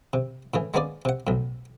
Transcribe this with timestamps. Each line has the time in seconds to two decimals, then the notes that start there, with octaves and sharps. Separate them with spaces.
0.13 C3
0.54 A2 C#3 E3
0.74 G#3 A#3 B3 C#4 G#4 D5
1.05 C3 F#5
1.27 B1 A2